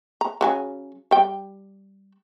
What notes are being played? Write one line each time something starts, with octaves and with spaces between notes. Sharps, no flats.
A#5
C#3 F#3 G#5
G3 G5